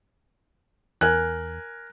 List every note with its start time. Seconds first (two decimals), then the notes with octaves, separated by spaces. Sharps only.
1.01 E2 A#4 G#5 F#6